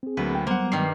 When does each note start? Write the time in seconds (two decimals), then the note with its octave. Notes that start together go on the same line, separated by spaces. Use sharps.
0.03 C4 G#4
0.17 D2 F#3 A#3 B4
0.35 G5
0.47 F#3 G3 A#3 B3 C5 F#5
0.72 G2 D#3 C7